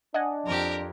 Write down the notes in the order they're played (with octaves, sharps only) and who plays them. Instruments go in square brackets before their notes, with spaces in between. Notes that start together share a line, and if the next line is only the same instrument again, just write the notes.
[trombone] D4 [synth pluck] D#5 F#5 G#5
[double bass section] F2 [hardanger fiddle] G4 A#4